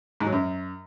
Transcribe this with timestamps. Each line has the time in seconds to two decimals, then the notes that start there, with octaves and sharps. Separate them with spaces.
0.20 G#2
0.26 F#3
0.32 F#2